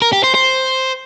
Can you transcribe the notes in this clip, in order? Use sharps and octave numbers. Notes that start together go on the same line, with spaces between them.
A#4
G4
C5
C5